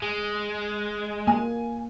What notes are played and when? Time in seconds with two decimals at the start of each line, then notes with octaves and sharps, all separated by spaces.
0.02 G#3
1.27 A#3 G#5